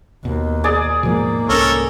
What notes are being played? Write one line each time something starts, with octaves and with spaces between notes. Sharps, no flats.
D#2 B2
G#4 D5
G#2 B2 F3 G#3 A#3
C2 C#4 A4 A#4 C#5